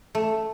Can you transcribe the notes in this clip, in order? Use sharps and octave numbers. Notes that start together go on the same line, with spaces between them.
A3